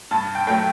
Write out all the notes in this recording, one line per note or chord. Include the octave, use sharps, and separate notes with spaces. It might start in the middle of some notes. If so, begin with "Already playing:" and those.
G2 A5
G5
F#3 A3 G5